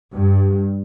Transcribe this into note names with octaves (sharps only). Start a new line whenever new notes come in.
G2